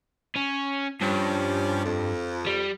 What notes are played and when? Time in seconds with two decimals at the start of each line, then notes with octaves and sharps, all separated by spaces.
0.36 C#4
1.01 G2 F3 G3 C#4
1.85 F2
2.47 G3